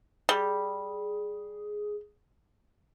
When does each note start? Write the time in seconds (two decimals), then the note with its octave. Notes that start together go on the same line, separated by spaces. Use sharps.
0.29 G3 G#4